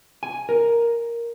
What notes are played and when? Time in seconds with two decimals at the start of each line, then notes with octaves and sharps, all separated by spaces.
0.23 G#5
0.49 A#4